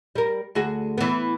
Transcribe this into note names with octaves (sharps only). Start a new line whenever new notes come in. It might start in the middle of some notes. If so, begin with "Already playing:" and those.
G3 A#4
D2 F#4 G#4
E3 B3